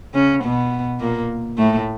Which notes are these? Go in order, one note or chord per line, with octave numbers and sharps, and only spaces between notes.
C#3 C#4
B2 B3
A#2 A#3
A2 A3